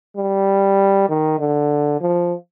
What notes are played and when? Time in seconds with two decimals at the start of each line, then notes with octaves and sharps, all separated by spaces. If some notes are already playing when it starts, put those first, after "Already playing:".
0.17 G3
1.09 D#3
1.39 D3
2.01 F3